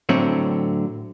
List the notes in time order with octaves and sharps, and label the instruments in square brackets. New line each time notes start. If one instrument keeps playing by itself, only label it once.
[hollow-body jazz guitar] A2 D3 F#3 C4 C#5